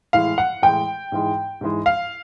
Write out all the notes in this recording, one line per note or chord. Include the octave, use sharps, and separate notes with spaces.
A2 E3 G#3 F5
F#5
A2 E3 G#3 G5
G#2 E3 G#3
G#2 E3 G#3
F5